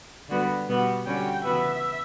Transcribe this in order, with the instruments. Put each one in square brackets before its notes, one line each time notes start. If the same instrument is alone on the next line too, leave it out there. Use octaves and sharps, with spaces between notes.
[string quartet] D3 G3 B3 F#4 B4
B2 G3 B3 F#4
[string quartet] D3 G3 C#4 F#4 [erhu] G5
[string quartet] C#3 E3 B3 F#4 B4 [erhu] E5